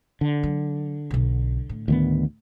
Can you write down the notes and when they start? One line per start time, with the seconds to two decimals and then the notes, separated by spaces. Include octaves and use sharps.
0.21 D3
0.43 F#3
1.11 B1 B2
1.69 A2
1.88 D2 D#3 B3